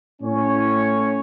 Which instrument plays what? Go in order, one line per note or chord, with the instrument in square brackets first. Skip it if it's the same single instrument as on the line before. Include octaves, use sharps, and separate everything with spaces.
[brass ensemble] A2 C#4 C#5